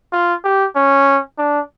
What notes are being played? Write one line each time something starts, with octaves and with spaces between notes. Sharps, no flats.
F4
G4
C#4
D4